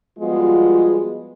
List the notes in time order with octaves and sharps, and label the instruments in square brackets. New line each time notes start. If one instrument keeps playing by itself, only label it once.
[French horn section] F3 G3 G#3 B3 F4 F#4